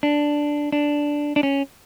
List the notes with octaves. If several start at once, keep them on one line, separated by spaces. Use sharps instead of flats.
D4
D4
D4
C#4